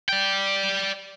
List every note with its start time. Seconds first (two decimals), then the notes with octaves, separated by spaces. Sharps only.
0.09 D5 G5